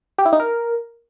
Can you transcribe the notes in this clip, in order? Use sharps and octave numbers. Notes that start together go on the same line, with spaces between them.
G4
E4
D#4
A#4